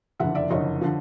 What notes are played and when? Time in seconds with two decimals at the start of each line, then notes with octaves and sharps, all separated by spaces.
0.20 F#1 F2 D3 E5 F#5
0.35 D5 E5
0.50 F#1 F2 D3 C#5 D#5
0.81 D3 F3